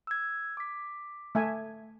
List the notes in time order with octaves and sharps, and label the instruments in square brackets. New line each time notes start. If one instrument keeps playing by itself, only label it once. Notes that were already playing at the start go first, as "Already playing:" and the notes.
[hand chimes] E6 G#6
D6 B6
[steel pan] A3 E5 G#5